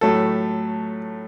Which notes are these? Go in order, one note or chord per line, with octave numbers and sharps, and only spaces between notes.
A2 F#3 A3 A4